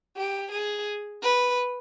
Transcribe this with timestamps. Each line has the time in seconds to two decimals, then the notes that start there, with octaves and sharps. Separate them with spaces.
0.17 G4
0.52 G#4
1.23 B4